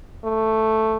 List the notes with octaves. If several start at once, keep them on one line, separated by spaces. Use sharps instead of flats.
A3